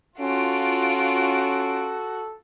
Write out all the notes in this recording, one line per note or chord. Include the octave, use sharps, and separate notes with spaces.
C#4 F4 F#4 A4 D7